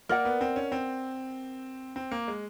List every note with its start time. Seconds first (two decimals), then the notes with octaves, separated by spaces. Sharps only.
0.09 A#3 A#4 D5 F#5
0.25 B3
0.41 C4
0.56 C#4
0.72 C4
1.96 C4
2.11 A#3
2.28 G#3